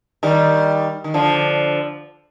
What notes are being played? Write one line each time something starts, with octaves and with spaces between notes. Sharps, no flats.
D#3 G3
D#3
D3 F3